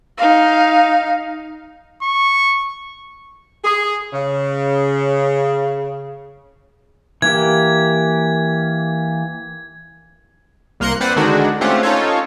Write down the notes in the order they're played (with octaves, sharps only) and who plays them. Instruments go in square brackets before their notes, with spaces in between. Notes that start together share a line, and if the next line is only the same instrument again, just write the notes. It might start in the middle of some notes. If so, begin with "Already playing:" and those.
[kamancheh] D#4 F5
[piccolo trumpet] C#6
[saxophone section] G#4
C#3
[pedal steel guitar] E3 A#3 G4 [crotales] G#6
[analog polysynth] C2 A#3 A#4 C6 F#6 C#7
C4 B4 C5 D5 F#5
D3 D#3 G#3 D4 D#4 F#4
A3 C4 C#4 F4 G4 F#5
C#4 D#4 F4 A4 C#5